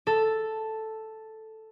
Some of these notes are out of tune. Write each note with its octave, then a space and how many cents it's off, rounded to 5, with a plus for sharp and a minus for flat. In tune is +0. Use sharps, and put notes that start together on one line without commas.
A4 +0